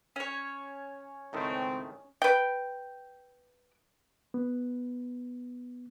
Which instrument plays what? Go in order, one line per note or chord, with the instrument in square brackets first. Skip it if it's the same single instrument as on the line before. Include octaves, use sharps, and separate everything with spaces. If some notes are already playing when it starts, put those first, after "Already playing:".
[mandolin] C#4 C#5
[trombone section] C#2 C4 [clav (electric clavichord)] A2 D#3 A3
[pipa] B4 G5
[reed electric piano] B3